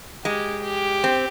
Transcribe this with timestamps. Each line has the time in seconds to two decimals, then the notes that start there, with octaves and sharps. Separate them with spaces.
0.25 G#3 G4
0.64 G4
1.04 C4